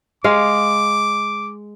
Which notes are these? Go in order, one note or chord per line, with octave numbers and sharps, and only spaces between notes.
G#3 F5 D6